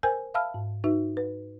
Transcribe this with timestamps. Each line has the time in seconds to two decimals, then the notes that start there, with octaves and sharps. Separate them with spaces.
0.03 A#4 C5 G5 G#5 E6 G6
0.34 E5 F5 A5 B5 E6 F6
0.54 G#2
0.84 D#4 F#4 B4 E5
1.17 B4